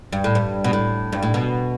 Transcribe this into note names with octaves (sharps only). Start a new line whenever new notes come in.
G2
A2
G2
B2
A2
G2
A2
B2